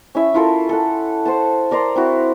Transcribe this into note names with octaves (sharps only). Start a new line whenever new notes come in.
C#4 E4 E5
E4 F4 A4 A#4
A4 F#5
C5 F#5 A5
A#4 D5 A#5 C6
C4 E4 F#4